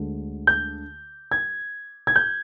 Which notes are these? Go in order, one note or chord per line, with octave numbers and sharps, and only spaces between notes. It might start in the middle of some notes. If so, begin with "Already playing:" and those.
Already playing: D2 D3 G#3
G6
G#6
G#6
G6